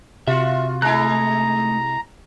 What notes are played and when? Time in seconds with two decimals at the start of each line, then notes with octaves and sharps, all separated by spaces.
0.28 C3 F4 F#4 E5
0.82 G#3 A3 D#4 E4 A#5 F#6